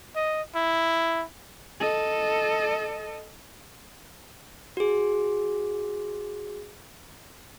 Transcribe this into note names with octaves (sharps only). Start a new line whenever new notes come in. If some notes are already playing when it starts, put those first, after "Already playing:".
D#5
E4
A4 D#5
F#4 G#4